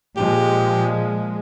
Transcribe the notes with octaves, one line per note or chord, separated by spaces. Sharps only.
A#2 F3 G#3 G4